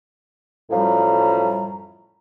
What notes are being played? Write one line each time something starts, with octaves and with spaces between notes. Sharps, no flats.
F#2 A2 F3 G3 A#5